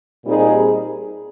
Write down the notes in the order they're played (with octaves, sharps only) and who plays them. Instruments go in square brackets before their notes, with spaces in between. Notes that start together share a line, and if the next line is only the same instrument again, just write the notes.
[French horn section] A#2 G3 C4 D#4 G#4